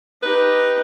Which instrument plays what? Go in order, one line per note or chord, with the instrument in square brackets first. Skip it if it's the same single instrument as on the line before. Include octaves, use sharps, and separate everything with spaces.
[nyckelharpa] D#4 G4 [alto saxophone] B4